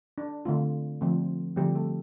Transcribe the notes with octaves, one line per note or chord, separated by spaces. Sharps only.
D4
D3 A3 C4 F4
D3 F3 A3 C4
D3 F3 G3 A3 C4 G4
A3 A4